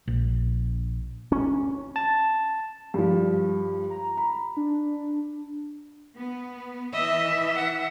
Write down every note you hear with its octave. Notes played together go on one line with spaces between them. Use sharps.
A#1
C#4
A5
G2 F3 G3
A#5
B5
D4
B3
E3 D#5 E5
F#5